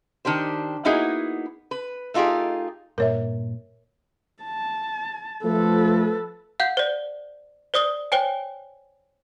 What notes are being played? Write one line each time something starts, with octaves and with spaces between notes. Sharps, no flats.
D#3 D4 G4 C5
A#3 B3 D#4 E4 F#4 G#4
B4
A3 D#4 F4 G4 G#4
G2 A#2 A#4 C#5 E5
A5
F3 A3 A4 B4
F5 F#5 G6
C5 D5
C5 D5 D#6 G7
C5 C#5 G5 G#5